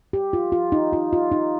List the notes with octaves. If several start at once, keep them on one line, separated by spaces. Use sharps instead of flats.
G4
F4
F4
D#4
F4
F4
D#4